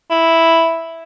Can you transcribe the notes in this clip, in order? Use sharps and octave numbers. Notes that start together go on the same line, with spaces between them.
E4